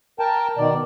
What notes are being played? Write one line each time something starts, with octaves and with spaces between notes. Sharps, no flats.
A#4 G5 A5
B2 D#3 D5